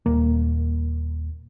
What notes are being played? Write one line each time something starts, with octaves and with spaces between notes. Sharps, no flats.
D#1 A#3